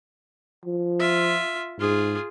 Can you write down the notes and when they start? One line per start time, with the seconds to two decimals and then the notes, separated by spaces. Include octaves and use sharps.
0.65 F3
0.99 F4 E5
1.79 G#2 F4 G#4